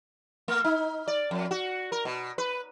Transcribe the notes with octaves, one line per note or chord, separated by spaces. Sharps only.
A3
D#4
D5
F2
F#4
A#4
B2
B4